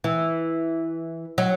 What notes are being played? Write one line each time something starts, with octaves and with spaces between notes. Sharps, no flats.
E3
F#3